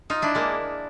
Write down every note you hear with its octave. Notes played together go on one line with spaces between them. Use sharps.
D#4 F4
D4 E4
G#3 A#3